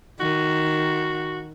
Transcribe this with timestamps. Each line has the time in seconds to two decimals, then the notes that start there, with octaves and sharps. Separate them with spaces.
0.20 D#3 F#4